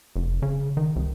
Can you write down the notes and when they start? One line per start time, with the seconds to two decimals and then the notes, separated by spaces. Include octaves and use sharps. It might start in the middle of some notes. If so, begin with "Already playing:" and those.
0.16 F1
0.42 C#3
0.77 D#3
0.96 C2